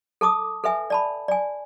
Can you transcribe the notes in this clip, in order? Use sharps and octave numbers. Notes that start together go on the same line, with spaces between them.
A4 A5 D6 D#6
A4 B4 E5 G#5
D5 A5 B5
D5 G#5